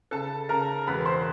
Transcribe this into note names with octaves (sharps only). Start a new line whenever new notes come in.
C#3 A4 A5
C#3 A#4 A#5
E1 B4 B5
C5 C6